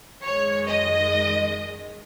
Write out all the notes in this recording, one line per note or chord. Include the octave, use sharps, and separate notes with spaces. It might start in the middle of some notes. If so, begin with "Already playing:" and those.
F#2 D#3 G#3 C#5
D#5